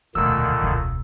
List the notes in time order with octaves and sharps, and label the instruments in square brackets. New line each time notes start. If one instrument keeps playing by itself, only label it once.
[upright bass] E1 D2 [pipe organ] A#2 D3 D#3 [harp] E6
[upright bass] E1 C#2